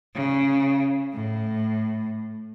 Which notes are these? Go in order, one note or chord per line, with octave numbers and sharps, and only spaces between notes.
C#3
A2